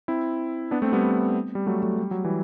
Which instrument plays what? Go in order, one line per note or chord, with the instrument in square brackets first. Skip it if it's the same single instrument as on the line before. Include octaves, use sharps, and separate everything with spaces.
[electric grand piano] C4 E4
B3 D4
A3 C4
G3 B3
G3
F#3 A3
F#3 A3
G3
F#3
E3 G3